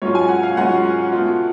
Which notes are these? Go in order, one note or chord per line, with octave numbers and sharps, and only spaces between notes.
G#2 F#3 C#4 F4 C#5
G#5
F#5
F5
G#2 F#3 C#4 F4 F#5
B2 A3 F4